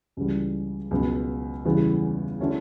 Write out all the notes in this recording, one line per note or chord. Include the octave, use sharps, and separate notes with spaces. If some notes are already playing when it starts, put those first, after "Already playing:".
C#2 C#3 E3 G3
C#2 B2 F#3 B3
E2 C#3 E3 G3 B3
D3 A3 C#4 E4